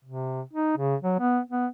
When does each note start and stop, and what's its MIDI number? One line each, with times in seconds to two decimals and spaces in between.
0.05 0.41 48
0.53 0.73 63
0.77 0.96 49
1.03 1.15 54
1.19 1.40 59
1.50 1.67 59